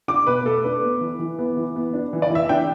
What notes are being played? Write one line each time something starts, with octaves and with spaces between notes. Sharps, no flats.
D4 D6
B2 B4
A3 A4
D4 B4
B3
E3
E3
B3
E3
B3
D4
E3
D5
E3 E5
D4 G5